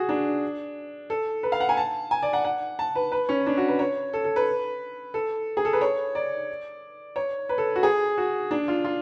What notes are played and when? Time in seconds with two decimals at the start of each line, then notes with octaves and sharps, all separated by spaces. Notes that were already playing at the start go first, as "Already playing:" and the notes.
Already playing: F#4 G#4
0.09 D4
1.10 A4
1.43 B4
1.52 F5
1.60 F#5
1.69 G#5
1.77 A5
2.11 G#5
2.22 D5
2.33 F#5
2.45 F#5
2.79 A5
2.95 B4
3.12 B4
3.29 C#4
3.46 D4
3.57 F#4
3.68 B4
3.79 C#5
4.13 A4
4.24 A4
4.36 B4
5.14 A4
5.57 G#4
5.65 A4
5.73 B4
5.81 C#5
6.15 D5
7.16 C#5
7.49 B4
7.58 A4
7.76 F#4
7.83 G#4
8.18 F#4
8.51 D4
8.68 F4
8.84 F4